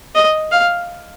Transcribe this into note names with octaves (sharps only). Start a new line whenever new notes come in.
D#5
F5